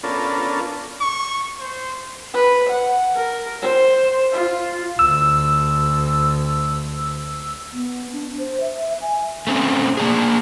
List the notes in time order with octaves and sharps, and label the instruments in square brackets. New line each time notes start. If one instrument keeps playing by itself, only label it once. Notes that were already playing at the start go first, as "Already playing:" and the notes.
[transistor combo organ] B3 C#4 D4 F4 A4 A#4
[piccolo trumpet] C#6
C5
[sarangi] B4
F#5
A#4
C5
F4
[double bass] D2 [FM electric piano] E6
[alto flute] B3
D4
C5
E5
G#5
[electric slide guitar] A3 C4 C#4
A#3 D4 G#4